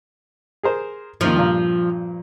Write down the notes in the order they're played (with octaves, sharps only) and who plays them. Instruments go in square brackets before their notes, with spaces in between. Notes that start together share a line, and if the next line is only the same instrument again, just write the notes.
[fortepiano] G#4 A#4 C5
[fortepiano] D#2 A#3 D#4 [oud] F3
[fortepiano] G2 A#2